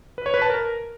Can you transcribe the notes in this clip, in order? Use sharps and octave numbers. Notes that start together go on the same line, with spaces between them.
B4
C#5
B4
A5
A#4